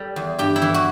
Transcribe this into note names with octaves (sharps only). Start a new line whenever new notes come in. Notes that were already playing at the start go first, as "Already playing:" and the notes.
Already playing: G3 A4
E2
G2 G4
E4
E3
F#4